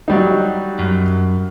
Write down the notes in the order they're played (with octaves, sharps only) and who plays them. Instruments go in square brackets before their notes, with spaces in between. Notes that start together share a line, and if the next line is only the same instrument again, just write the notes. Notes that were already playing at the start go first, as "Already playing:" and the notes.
[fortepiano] F#3 G3 D#4
[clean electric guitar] F#2